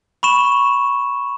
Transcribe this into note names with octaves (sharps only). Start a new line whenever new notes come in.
B5 C#6 E7